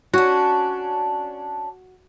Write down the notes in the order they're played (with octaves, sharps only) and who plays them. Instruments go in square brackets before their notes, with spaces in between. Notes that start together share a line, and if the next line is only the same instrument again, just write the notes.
[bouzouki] C#4 D4 [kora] F#4